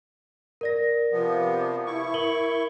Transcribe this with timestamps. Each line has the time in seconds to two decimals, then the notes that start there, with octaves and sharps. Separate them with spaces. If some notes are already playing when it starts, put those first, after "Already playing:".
0.61 A#4 D5 A#6
1.12 C3 F3 B3
1.86 E4 C#6
2.14 A#4 F#7 G7